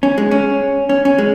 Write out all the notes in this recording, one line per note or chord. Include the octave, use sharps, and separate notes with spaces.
C#4
G#3
C#4
C#4
C#4
G#3